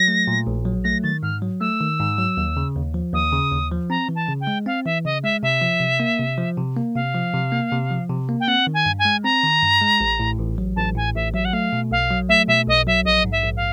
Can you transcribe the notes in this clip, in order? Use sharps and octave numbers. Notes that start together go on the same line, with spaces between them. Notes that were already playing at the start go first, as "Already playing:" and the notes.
Already playing: F#3 A#6
A3
A#2
A#1
F#3
A3 A#6
D#3 A6
G#2 F6
F#3
A3 E6
D#3
G#2
F#3
D#2
C#3
D#2
F3
D#2 D#6
C#3
D#2
F3
C4 A#5
E3
A5
C#3
G5
G#3
C4 F5
E3 E5
C#3 D#5
G#3 E5
C3 E5
F3
C3
A#3
C3
F3
C3
A#3
C3 F5
F3
C3
A#3
C3
F3
C3
A#3
G5
C4 F#5
D#3
G#5
G2
G#5
G#3
C4 A#5
D#3
G2
G#3
A1
A2
A1
F#3
A1 A5
A2 G#5
A1 E5
F#3 E5
F#5
A3 F5
B2
B1 F5
F#3
A3 E5
B2 E5
B1 D#5
F#3 E5
A#1 D#5
G#2
E5
A#1
F5